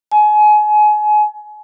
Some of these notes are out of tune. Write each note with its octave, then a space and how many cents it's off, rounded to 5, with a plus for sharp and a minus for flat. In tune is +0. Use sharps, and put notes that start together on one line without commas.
G#5 +30